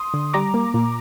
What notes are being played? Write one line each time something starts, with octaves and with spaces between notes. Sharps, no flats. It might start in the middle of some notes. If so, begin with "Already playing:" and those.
Already playing: C6 D#6
D3
G3 A#5 D6
A#3
A#2